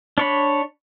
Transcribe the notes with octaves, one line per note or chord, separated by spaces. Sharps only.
D4 C#5 B5